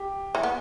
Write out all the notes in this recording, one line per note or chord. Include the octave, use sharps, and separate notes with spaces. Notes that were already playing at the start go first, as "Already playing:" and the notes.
Already playing: G4
E3
B3